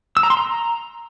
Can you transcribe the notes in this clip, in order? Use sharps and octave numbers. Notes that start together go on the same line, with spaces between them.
E6
A#5
C6
A#5